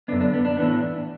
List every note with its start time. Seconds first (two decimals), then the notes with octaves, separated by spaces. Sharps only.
0.08 F#2 D3 B3 D4
0.21 D4
0.34 B3
0.45 D4
0.57 A2 E3 B3